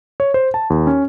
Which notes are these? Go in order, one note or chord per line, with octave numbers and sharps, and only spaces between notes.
C#5
C5
A5
D#2
C#4